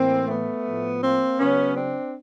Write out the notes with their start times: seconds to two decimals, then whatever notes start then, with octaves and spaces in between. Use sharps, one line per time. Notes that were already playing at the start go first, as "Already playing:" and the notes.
Already playing: A2 E3 A#3 C4
0.28 A3 B3
0.65 A2 F3
1.01 A#3 C4
1.38 C#3 F#3 B3 C#4
1.75 C4 D4